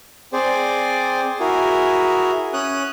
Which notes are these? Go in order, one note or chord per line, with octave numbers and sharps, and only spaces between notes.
C4 G#4 C5 D5
E4 F#4 G#4 A#4
C#4 C#5 D#6 F#6